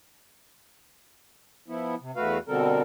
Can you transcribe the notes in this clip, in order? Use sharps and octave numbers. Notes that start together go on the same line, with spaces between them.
F3 B3 E4
C3
E2 A3 F#4 B4 F5
B2 D3 G3 C4 A4 A#4